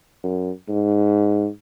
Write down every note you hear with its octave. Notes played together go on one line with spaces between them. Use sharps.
F#2
G#2